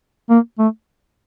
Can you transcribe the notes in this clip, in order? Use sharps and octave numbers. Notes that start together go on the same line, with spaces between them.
A#3
A3